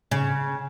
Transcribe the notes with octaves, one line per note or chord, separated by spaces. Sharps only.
C#3